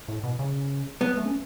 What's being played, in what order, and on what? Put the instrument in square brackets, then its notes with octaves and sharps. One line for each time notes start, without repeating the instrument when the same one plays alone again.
[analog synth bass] A2
B2
C#3
[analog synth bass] F#3 [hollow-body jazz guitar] B3
[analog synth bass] A3
C#4